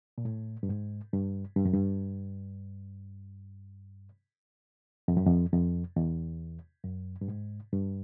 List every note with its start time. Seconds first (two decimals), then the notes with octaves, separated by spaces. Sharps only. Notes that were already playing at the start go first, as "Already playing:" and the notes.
0.18 A#2
0.25 A2
0.63 G2
0.69 G#2
1.13 G2
1.56 G2
1.65 F#2
1.74 G2
5.08 F2
5.17 F#2
5.26 F2
5.52 F2
5.96 E2
6.84 F#2
7.21 G2
7.28 G#2
7.72 G2